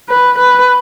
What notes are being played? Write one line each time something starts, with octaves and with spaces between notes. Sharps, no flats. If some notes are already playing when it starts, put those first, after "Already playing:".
B4
B4